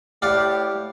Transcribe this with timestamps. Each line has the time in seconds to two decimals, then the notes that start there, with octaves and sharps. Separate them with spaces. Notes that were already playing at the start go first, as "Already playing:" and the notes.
0.22 A2 G4 D5 F5 F#5